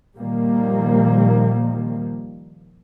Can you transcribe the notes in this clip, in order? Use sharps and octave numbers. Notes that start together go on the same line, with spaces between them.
A#2 D#3 F3 G3 A#3